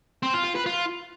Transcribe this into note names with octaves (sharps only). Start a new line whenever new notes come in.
C4
F4
F4
B4
F4